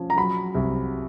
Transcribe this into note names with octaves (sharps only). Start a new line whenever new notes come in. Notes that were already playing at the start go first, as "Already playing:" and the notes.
Already playing: F3 C#4
A#5
F#3 B5
C2